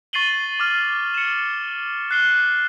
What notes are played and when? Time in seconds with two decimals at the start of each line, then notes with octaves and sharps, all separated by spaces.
0.13 C#6 A6 C7 D#7 F#7 G7
0.60 D6 F6
1.14 C#7 E7
2.11 F#6 C7 G7